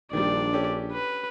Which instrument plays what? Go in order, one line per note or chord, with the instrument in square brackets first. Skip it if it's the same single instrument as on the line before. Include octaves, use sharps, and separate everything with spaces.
[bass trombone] A#1 [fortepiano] D#3 G3 [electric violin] D4 D5
[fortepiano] C#4 G4 A4
[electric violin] B4